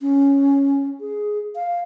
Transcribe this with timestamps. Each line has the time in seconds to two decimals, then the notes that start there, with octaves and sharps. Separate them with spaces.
0.01 C#4
1.00 G#4
1.55 F5